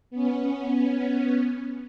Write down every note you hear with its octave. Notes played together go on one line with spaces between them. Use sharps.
B3 C#4